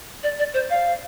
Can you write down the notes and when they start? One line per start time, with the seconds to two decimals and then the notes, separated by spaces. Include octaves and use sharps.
0.23 D5
0.39 D5
0.54 C5
0.70 F5